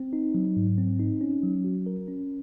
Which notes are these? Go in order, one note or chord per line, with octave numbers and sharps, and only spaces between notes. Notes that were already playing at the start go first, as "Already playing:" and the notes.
Already playing: C4
D#4
F#3
G#2
C4
D#4
C#4
F#3
F#4
A#4
C#4